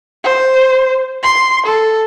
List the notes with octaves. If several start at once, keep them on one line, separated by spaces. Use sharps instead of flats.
C5
C6
A4